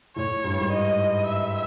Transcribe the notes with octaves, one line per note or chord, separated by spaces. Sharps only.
A2 C#5
G2
G#2
D#5
E5